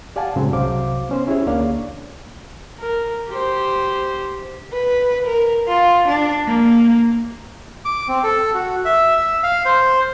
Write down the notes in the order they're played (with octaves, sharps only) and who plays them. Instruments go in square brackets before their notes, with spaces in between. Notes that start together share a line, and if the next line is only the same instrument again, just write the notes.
[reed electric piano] G4 D5 F5 F#5 G#5 A5
F#2 A2 C#3 F#3 G#3 C4
C2 C3 F#3 C5 F5 D6
B3 C#4 C5
C#4 E4 G4 G#4 C#5
D2 A#3 D4 C#5 D5 F5
[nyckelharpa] A#4
G4 C5
[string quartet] B4
A#4
F4
D4
A#3
[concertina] D6
C4
A4
F#4
E5
E6
F5
C5